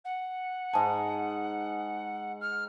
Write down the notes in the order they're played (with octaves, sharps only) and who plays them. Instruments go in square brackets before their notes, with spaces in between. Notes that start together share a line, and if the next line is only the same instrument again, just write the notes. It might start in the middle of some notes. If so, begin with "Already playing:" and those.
[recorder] F#5
[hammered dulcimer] G#2 G#5 [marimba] A5
[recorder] F6